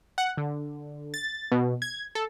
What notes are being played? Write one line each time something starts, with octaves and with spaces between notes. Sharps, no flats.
F#5
D3
A6
B2
G#6
A4